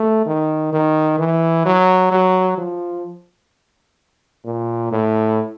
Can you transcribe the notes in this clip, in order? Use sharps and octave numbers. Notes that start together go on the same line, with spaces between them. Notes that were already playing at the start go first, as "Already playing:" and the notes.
Already playing: A3
D#3
D#3
E3
F#3
F#3
F3
A#2
A2